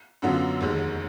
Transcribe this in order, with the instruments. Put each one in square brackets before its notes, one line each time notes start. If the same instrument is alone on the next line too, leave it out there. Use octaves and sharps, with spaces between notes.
[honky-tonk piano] F#2 D3 F#3 B3 F4
F1 D#2 D#3 G#3